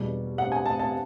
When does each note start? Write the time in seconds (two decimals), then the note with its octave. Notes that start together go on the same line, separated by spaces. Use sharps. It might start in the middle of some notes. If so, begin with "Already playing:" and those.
Already playing: E2 B2 G3
0.38 F#5
0.52 G#5
0.66 A5
0.79 A5